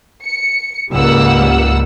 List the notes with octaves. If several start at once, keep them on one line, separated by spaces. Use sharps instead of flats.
C#7
C#2 G#2 G3 A#3 F#5 E6